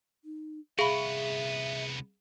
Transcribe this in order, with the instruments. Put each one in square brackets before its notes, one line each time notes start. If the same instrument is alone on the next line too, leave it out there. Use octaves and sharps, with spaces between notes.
[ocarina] D#4
[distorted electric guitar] C2 B3 [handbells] G#4 [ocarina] E5 [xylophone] F5 B5